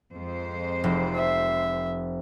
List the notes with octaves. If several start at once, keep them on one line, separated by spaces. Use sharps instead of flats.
F2 G#3 C5
F1
E5